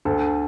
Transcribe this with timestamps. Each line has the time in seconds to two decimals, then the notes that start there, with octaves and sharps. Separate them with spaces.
0.05 D2 A4